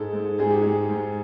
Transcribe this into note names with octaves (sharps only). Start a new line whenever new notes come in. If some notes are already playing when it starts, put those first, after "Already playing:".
Already playing: G#2 G#3 A4
G#2
G#2 G#4
G4
G#3 G#4
G#2